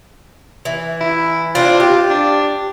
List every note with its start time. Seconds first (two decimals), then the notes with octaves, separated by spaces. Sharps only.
0.65 E3
1.01 E4
1.55 C4 D4 F4
1.80 G4
2.10 D4